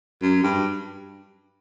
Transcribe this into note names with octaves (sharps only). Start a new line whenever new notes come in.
F#2
G2